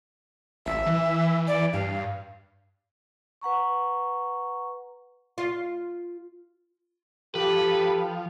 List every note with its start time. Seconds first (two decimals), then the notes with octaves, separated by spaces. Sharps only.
0.66 A1 E5
0.86 E3
1.47 D5
1.73 G2 F5
3.41 B4 F#5 A#5 C#6
5.38 F4
7.35 F3 G4 A4 B4